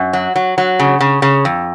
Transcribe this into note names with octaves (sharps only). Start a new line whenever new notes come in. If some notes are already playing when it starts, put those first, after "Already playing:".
Already playing: F#2
F#3
F#3
F#3
C#3
C#3
C#3
F2